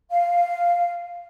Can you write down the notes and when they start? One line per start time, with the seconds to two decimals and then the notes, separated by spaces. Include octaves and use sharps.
0.11 F5